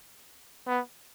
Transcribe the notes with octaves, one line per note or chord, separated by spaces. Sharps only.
B3